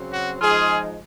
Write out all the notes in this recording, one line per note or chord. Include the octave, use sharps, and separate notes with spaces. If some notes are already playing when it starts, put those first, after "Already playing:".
Already playing: C#3 F#3 C4
F#4
F3 G#3 D#4 F4 G#4